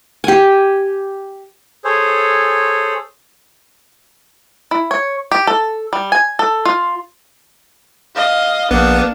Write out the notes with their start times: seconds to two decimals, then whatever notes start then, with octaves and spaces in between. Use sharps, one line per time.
0.24 G4 G#5
1.84 G#4 A4 C5 C#5
4.71 E4
4.91 C#5
5.31 G4
5.47 A4
5.93 G3
6.12 G#5
6.39 A4
6.65 F4
8.15 D#5 F5
8.71 A#1 A#3 B3 D4 B4